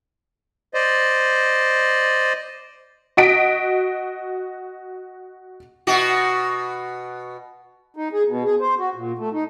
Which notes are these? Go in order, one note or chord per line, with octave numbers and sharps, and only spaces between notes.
C5 D5 D#5
F#4 D#5 B6 D7
B2 F#4
D#4
G#4
B2
G#4
C5
F#4
A#2
A3
D#4